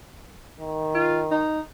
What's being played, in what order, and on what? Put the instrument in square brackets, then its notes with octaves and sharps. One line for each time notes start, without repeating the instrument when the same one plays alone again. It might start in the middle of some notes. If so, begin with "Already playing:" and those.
[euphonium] D#3
[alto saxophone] F4
D#4